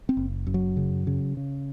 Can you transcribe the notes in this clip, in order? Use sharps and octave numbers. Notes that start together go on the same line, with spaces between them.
C4
F#1
F#2
F#3
C#3
C#3
C#3